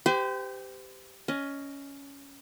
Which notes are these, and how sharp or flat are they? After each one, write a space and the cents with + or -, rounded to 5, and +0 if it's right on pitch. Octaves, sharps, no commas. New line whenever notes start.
G4 +0 C5 -40 G#5 -40
C#4 +10 D#5 +0